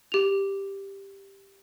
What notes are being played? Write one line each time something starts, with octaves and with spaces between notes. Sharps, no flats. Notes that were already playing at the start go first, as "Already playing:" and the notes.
G4 F7